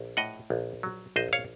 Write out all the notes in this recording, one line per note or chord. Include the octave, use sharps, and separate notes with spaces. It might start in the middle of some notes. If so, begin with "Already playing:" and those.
Already playing: A#1
A2 D#5 F#5
A#1
F#3
A#1 C5 D#5
C#5 F5